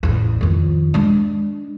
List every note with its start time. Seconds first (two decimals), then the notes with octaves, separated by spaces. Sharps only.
0.03 A1 E2
0.41 F2 D#3
0.94 G#3 D4